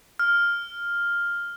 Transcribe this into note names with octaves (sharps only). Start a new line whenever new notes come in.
F6